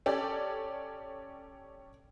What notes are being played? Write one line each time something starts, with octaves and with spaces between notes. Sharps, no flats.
C#4 G4 A4 D5